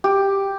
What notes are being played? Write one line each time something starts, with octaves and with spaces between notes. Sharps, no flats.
G4